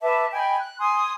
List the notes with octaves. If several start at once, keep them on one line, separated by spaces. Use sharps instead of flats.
B4 E5 A5 D6
D#5 G5 G#5 B5
F#6
G#5 C6 D#6